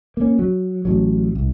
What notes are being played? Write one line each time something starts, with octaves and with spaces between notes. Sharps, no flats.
A#3 C#4
F#3
A1 F#3
C2